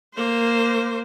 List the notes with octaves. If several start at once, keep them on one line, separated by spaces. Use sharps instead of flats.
A#3 C5